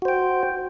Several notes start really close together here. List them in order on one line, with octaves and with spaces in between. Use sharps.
F#4 C5 G5